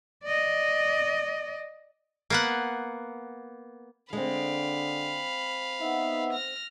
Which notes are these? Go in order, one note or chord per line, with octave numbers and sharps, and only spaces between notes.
D5 D#5
A#3 B3 F#5
D3 G#3 C4 F5 B5
B3 D#4 E5
F6 A#6